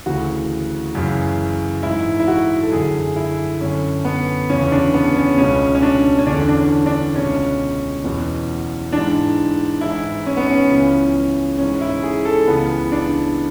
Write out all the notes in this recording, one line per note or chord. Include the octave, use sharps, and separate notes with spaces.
D2 C#3 E3 F#4
F#2 C#3 E3
G#2 E3 E4
E4
F#4
A4
F#2 D3 G#4
E4
F#2 D3 C#4
B3
E2 C#3 E3 C#4
D4
B3
C#4
C#2 B2 C#4
C#4
D4
C#4
E2 D3 D4
D4
C#4
D4
C#2 B2 C#4
E2 B2
G#2 E3 D4
G#2 E3 E4
C#4
B3
C#4
C#2 C#3 E3
G#2 E3 C#4
E4
G#4
A4
C#2 C#3 E3 B3
D4